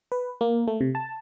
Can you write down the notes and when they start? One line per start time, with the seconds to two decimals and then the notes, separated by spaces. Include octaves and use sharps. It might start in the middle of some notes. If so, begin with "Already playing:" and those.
0.12 B4
0.41 A#3
0.68 A3
0.81 C3
0.95 A5